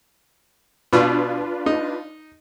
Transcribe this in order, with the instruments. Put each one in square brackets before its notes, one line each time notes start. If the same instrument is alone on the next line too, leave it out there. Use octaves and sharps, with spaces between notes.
[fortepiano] B2 [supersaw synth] D4 F4 B4
[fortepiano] D#4